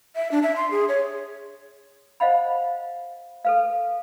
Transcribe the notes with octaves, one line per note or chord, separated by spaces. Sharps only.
E5
D4
E5
C6
G#4
C#5
C5 D#5 F5 F#5 B5
A4 B4 F5